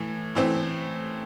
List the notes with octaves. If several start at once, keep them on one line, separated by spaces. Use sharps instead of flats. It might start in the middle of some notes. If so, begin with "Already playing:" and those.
Already playing: A2 E3
A2 E3 A3 C4